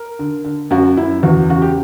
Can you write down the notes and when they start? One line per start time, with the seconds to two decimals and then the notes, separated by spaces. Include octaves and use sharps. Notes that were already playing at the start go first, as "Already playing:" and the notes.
Already playing: A#4
0.19 D3
0.44 D3
0.71 F#2 F#4
0.97 F#2 E4
1.23 E2 F#4
1.49 C#3 F#4
1.62 G4